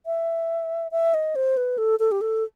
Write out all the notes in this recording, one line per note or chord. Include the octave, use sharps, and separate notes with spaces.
E5
E5
D#5
C5
B4
A4
A4
G4
A4